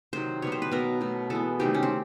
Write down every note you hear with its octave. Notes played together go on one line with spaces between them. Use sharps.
C3 D#3 F#3 C5
B2 G3 B3 C#5
C5
B4
B2 F#3 B3 A#4
B2 F#3 A3
E3 G#3 B3 A4
C3 D#3 F#3 A3 G4
C#4
C4